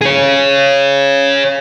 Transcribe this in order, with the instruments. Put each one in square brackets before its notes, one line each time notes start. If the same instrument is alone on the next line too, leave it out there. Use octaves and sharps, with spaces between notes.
[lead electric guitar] G#4 C#5